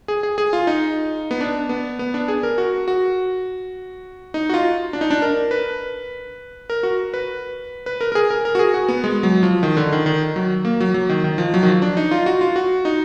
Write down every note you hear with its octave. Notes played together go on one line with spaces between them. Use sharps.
G#4
G#4
G#4
F4
D#4
B3
D4
B3
B3
D4
G#4
A#4
F#4
F#4
D#4
F#4
F4
D4
D#4
D4
A#4
B4
A#4
F#4
B4
B4
A#4
A#4
G#4
A#4
A#4
F#4
G#4
F#4
B3
G#3
F#3
F3
D#3
D3
D#3
D#3
F#3
A#3
F#3
F#3
D#3
D#3
F3
F#3
D#3
F3
D4
D#4
F4
F#4
F4
F#4
D#4